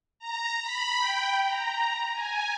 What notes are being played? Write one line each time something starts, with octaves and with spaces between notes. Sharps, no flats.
A#5
B5
G5
A#5
G#5